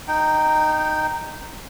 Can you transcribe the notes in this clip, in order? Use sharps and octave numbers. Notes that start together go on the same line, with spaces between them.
D#4 G5